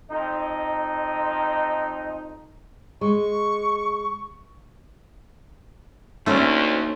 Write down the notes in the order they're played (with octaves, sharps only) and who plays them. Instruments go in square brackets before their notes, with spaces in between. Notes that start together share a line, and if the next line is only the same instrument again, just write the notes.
[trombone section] F2 D#4
[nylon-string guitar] G#3 [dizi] C#6
[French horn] D2 [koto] A3 C#4 [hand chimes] A#3 D#4 C6